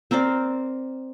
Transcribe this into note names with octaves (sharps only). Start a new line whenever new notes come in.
C4 A#4 C5 D5